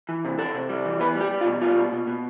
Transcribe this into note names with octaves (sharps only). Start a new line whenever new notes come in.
E3
C3
C3 A4
C3
G3
E3
B3 B4
G3
G4
G3
F4
B2
G3 F4
B2
B2
B2